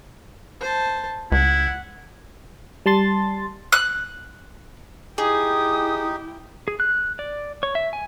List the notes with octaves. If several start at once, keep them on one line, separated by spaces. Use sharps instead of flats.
C5 A5
C#2 E4 F#5
G3 A5 C6 A6
F#6
D#4 E4 G4 G#4 G5 D#6
G#4
F#6
D5
C#5
E5
G#5